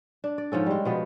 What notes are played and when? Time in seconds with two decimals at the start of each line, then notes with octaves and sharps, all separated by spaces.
0.24 D4
0.38 D5
0.52 G#2 F3 C#4 A4
0.66 G3 G#3
0.85 B2 F3 B3